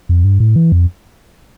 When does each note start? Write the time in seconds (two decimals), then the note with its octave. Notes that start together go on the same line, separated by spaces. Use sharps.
0.09 F2
0.24 G2
0.40 A2
0.56 E3
0.72 F2